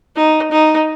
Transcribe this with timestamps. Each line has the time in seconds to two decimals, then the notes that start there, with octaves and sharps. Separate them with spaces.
0.16 D#4
0.51 D#4